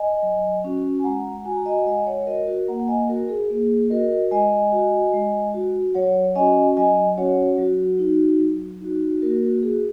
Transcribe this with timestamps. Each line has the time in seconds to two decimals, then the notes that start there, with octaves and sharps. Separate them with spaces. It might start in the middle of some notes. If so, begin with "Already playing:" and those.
Already playing: D#5 G#5
0.23 F#3
0.64 C#4 F#4
0.99 G#5
1.04 G#3 F#5 A#5
1.45 F#4 G#5
1.56 A#5
1.66 D#5 G#5
1.82 F#5
1.86 G#3 D#5 G#5
2.07 C#5 F#5
2.27 F#4 A#4 D#5
2.47 F#4 A#4
2.68 A#3 F#5 A#5
2.79 F#5
2.88 D#5 G#5
3.09 F#4 A#4
3.29 G#4
3.50 A#3 G#4
3.90 F#4 A#4 D#5
4.31 G#3 D#5 G#5
4.72 F#4
5.13 G#3
5.54 F#4
5.94 F#3 C#5 F#5
6.35 C#4 F#4 D#5 G#5
6.77 F#3 D#5 G#5
7.17 C#4 F#4 C#5 F#5
7.58 F#3 F#4
7.99 D#4 F#4
8.40 F#3
8.81 D#4 F#4
9.22 A#3 F#4 A#4
9.43 F#4
9.62 F#4 G#4